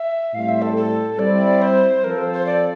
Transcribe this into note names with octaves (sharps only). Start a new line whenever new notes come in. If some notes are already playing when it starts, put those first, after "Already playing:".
Already playing: E5
A2 G3 C4 F5
E5
A4
A4
G3 C4 E4 D5
C5
F3 C4 F4 A4 A#4
C5
C5
D5